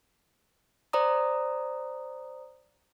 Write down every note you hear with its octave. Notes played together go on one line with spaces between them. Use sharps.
C5 D5 A#5 D#6